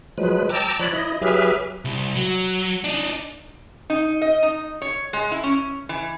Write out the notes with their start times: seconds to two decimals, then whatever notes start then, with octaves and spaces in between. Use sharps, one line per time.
0.18 F3 F#3 G#3 B4
0.49 G5 A5 A#5 D6 E6
0.79 F3 C#5 D5 B5 F#6
0.93 E4 D#5
1.22 F#3 G4 G#4 B4 E5 F6
1.85 C2
2.16 F#3
2.84 D4 D#4
3.90 D#4
4.22 D#5
4.43 D#4
4.82 C#5
5.13 G#3
5.32 E4
5.43 C#4
5.89 E3